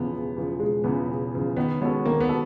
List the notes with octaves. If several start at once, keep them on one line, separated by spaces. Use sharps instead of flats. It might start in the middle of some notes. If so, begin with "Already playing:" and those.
Already playing: E1 E2 C#3 F3 B3
E1
E2 C#3 F3
E1 G#3
E2 C#3 F3 B3
E1
E2 C#3 F3
D#3 B3
G#3 B3 C#4 F#4 A4
D#3 A#3
B3
F#4 A4